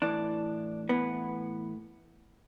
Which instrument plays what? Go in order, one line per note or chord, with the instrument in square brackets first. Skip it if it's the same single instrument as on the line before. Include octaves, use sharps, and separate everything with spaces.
[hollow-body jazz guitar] A2 E3 D4
A2 E3 B3